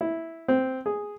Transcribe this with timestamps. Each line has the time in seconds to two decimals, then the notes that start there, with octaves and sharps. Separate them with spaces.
0.01 E4
0.48 C4
0.86 G#4